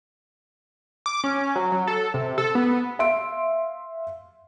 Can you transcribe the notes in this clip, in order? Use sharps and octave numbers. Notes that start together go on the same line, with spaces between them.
D6
C#4
F#3
F#3
A4
C3
A4
B3
E5 F5 C6 D7